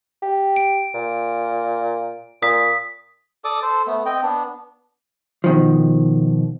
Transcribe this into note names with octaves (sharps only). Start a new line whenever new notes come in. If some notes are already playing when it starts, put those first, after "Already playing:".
G4
D7
A#2
A#2 D#6 B6
A4 D5 D6 D#6
A4 C5
A3 B3
C4 D#5 G5
B3 D4
B2 D#3 F3